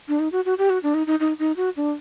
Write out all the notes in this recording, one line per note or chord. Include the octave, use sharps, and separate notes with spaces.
D4
D#4
F#4
F#4
G4
F#4
D4
D#4
D#4
D#4
D#4
F#4
D4